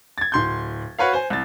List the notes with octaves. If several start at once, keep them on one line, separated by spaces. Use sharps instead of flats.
G#6 A6
D1 C6 G6
F#4 B4 C#5 F5
C5 G#5
C2 A6